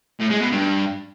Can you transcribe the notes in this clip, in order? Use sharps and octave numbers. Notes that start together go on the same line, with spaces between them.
A2
G#3
B2
G2